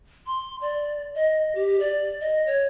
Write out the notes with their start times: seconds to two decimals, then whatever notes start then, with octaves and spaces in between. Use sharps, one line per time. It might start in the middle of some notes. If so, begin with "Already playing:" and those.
0.26 C6
0.61 D5
1.15 D#5
1.55 G4
1.80 D5
2.20 D#5
2.46 C#5